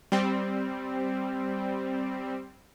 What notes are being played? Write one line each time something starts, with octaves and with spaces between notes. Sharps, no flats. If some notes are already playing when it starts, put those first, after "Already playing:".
G3 C4